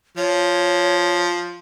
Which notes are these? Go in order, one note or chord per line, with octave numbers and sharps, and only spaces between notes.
F3 C#5